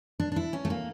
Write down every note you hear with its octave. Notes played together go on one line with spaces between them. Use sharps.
D4
D4
E4
C#4
A3
A#3